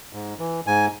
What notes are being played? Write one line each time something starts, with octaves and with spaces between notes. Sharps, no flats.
G#2
E3
G#2 G#5